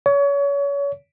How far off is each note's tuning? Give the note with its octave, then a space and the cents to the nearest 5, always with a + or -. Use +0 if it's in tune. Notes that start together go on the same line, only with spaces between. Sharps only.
C#5 +30